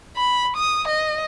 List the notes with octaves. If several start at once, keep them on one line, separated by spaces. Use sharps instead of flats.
B5
D#6
D#5